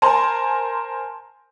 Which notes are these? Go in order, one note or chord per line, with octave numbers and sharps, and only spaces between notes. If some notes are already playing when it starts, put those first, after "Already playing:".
A#4 C5 G#5 A5 C6